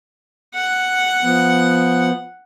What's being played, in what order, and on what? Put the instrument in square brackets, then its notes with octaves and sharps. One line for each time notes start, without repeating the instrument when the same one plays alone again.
[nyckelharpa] F#5
[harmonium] F3 B3